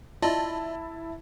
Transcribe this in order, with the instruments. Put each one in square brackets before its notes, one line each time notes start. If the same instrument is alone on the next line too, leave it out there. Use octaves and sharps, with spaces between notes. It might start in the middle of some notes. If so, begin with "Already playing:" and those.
[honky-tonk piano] E4 A5 [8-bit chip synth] F4 D5 D#5